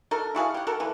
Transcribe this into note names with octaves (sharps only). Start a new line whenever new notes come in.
D4 F#4 A4 A#4
E4 F#4 G#4 F5
G4 F#5
F#4 A4 A#4
D3 E3 A#3